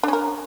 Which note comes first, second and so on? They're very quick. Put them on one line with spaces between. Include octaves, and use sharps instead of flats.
D4 C#4 A#4